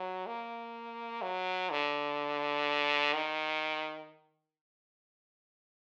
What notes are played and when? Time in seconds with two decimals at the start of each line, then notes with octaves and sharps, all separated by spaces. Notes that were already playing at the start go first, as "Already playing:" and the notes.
Already playing: F#3
0.26 A#3
1.22 F#3
1.70 D3
3.14 D#3